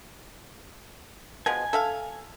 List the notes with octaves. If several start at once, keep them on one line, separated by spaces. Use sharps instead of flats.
B2 F3 G#3 G#5
A4 E5 F5